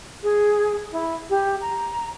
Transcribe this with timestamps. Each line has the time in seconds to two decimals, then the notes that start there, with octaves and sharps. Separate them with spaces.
0.23 G#4
0.91 E4
1.29 G4
1.61 A#5